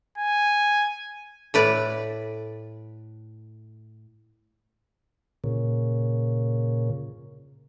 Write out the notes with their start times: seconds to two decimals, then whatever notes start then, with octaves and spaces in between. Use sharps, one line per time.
0.18 G#5
1.54 A2 B4 D5
5.44 A#2 C#3